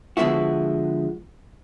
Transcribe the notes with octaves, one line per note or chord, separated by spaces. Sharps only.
D3 F3 G#3 B3 E4 F#4